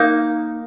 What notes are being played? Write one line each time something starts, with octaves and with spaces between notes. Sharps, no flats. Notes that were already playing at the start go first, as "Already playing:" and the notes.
Already playing: A#3 D#4